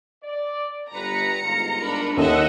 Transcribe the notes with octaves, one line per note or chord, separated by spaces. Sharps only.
D5
G1 G2 B4 A#5 C#7
G1 G#2 F4
D4 A#4 B5
D#2 A4 D#5 E5 F#5